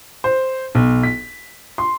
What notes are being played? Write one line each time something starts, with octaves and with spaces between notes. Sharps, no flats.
C5
B1
B6
C6